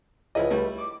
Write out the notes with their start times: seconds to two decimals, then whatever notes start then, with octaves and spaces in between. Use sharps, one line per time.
0.35 C#2 F3 E4 D#5
0.50 G3 A3 E4
0.78 D6